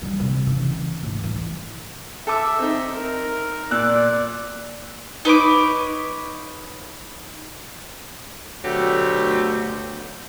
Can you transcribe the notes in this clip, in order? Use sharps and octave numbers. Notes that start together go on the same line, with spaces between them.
D3 G3
C3
C#3 E3
A1 G#2
E3 A3
A4 E5 D6 E6
C4 D#4
A#4
A#2 D5 E6 F#6
D#4 B4 C#5 D6
D2 B2 D3 F#3 A3 G4